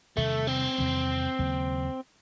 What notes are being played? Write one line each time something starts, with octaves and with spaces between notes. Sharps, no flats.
E2 C3 D#3 G3 A3
C4
E2 C3 D#3 G3
D#2 C#3 F#3 A#3